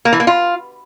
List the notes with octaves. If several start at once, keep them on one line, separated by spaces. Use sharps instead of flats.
A#3
E3
A#3
F4